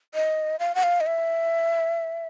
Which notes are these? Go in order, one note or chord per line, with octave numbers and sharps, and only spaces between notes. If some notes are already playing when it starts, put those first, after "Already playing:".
D#5
F5
F#5
F5
D#5
E5